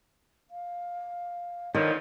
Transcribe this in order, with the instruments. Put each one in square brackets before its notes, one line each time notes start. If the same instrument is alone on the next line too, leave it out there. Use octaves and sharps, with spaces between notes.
[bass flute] F5
[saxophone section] G2 D3 F3 [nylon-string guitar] D#3 [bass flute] C#5